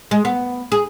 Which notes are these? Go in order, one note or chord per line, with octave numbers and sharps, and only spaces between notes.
G#3
B3
G#4